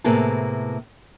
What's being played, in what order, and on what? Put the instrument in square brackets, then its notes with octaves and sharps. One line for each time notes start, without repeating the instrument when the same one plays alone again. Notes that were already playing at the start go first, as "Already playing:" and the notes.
[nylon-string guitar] A2 C3 A#3 B3 G#4 A4